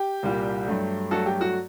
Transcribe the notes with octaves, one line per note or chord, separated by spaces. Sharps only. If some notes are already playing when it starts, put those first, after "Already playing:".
Already playing: G4
C2 A#2 G3
G2 F#3 A3
G2 F#3 A3 F#4 A4
G4
F#4